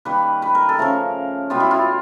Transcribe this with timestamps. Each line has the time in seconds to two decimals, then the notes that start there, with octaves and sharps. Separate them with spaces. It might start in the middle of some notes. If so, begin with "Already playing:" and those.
0.05 D#3 G3 A#3 B4
0.42 B4
0.55 A#4
0.69 A4
0.78 C#3 F3 A3 A#4
1.50 B2 G3 B3 F4
1.60 E4
1.71 F4